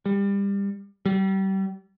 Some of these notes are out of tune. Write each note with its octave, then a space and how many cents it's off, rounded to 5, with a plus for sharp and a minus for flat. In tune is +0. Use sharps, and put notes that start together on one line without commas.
G3 +25
G3 -30